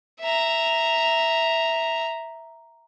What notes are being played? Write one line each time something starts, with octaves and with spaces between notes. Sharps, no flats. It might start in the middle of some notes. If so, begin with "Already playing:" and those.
E5 A#5